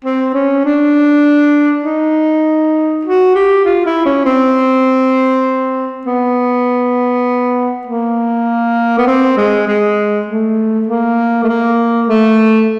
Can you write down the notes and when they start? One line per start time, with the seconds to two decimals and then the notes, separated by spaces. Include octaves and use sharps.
0.05 C4
0.34 C#4
0.65 D4
1.85 D#4
3.05 F#4
3.35 G4
3.65 F4
3.86 E4
4.06 C#4
4.25 C4
6.07 B3
7.87 A#3
8.98 B3
9.07 C4
9.37 G#3
9.67 G#3
10.27 A3
10.88 A#3
11.44 A3
11.48 A#3
12.08 A3